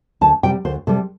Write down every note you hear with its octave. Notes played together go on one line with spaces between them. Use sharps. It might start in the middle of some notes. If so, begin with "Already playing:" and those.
D2 A5
C3 G3 G5
D2 C5
C3 G3 A4